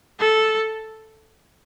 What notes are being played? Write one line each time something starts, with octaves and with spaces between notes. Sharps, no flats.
A4